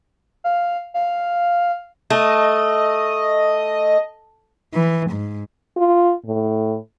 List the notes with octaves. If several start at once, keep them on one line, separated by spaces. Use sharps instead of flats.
F5
F5
A3 D#5
E3
G#2
F4
A2